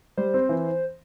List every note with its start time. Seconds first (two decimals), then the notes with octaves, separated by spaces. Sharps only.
0.17 G3 C5
0.34 C4
0.49 E3